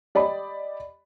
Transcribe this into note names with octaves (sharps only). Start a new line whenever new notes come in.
G4 D5 D#5 B5